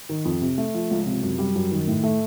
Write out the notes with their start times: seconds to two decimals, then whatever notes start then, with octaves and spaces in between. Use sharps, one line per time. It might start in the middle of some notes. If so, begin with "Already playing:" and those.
0.09 D#3
0.25 F2
0.41 C3
0.58 A3
0.74 F3
0.91 C#2
1.06 C3
1.23 F#2
1.38 G3
1.55 F#2
1.72 D#3
1.88 A2
2.03 A3